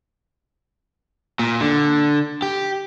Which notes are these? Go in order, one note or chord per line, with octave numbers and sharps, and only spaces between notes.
A#2
D3
G4